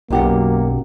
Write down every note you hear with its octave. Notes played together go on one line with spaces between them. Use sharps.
B1 F#2 A#3 G4 F#5